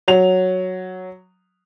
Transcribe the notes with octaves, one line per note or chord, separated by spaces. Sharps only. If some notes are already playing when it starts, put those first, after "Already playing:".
F#3 F7